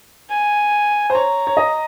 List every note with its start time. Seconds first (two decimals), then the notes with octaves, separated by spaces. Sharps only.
0.30 G#5
1.10 C5
1.14 C#5 A#5
1.47 C#5
1.57 D#5